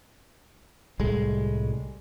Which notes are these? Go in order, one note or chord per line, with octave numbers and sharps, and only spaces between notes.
C2 A2 G3 G#3